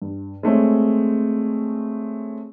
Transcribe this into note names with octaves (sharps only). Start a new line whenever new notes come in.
G2
G#3 A3 C4 C#5